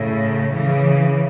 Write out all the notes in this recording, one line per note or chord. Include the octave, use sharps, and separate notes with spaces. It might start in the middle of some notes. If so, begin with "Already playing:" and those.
Already playing: A2 C#3
C#3 E3